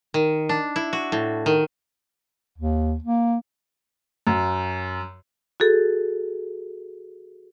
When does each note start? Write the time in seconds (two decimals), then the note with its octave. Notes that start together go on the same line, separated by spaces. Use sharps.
0.14 D#3
0.49 D4
0.76 E4
0.93 F#4
1.12 A2
1.46 D#3
2.58 D#2
3.04 A#3
4.27 F#2
5.60 F#4 G#4 A4